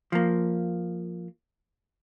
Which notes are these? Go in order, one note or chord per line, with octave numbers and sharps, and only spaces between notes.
F3 A#3